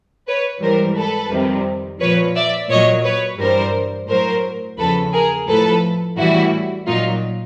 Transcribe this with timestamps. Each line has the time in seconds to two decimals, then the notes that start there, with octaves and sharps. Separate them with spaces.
0.28 B4 C#5
0.61 G#2 E3 G3 A#4 C5
0.96 A4 B4
1.31 F2 C3 D#3 G3
2.00 A#2 F3 B4 C#5
2.35 D5 E5
2.70 A#2 F#3 C#5 D#5
3.04 B4 C#5
3.39 G2 E3 G3 A#4 C5
4.09 A2 F#3 A#4 C5
4.78 E2 C#3 F3 A4 B4
5.13 G#4 A#4
5.48 A2 F3 A4 B4
6.18 A2 E3 G3 E4 F#4
6.87 A#2 F#3 D#4 F4